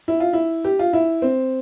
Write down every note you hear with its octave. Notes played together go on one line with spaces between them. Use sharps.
E4
F4
E4
G4
F4
E4
C4